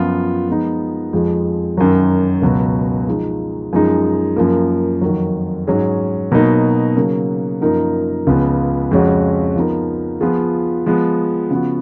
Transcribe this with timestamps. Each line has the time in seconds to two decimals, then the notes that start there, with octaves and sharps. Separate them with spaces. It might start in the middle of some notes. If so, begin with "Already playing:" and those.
Already playing: F#2 F3 B3 F4
0.48 F3 G#3 B3 D#4
1.13 F2 F3 G#3
1.77 F#2 D#3 F#3
2.42 C#2 B2 F#3
3.07 F3 G#3 D#4
3.73 F#2 F3 G#3 D#4
4.36 F#2 F3 A#3
5.02 F2 D#3 F#3
5.67 G#2 F#3 C#4 G#4
6.32 B2 F#3 A#3 D#4
6.97 C#3 F#3 A#3
7.61 F#2 F3 A#3 D#4 A#4
8.27 C#2 C#3 F3 B3
8.91 F2 C#3 G#3 C#4 F#4
9.56 F3 B3 D#4 A#4
10.21 F3 B3 F4 G#4
10.86 F3 G#3 B3
11.50 C#3 F3 B3 F#4